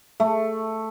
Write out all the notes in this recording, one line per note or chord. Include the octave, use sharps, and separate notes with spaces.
A3